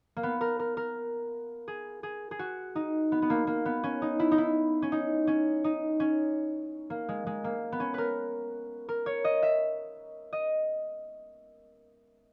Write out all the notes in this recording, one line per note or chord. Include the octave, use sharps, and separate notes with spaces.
A#3
B3
A#4
A#4
A#4
G#4
G#4
G#4
F#4
D#4
B3
B3
A#3
A#3
B3
C#4
D#4
E4
D#4
E4
C#4
D#4
C#4
D#4
C#4
A#3
G#3
G#3
A#3
B3
C#4
A#4 B4
A#4
C#5
D#5
E5
D#5